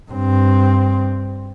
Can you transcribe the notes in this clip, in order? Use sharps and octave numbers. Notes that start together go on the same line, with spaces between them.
G2 C4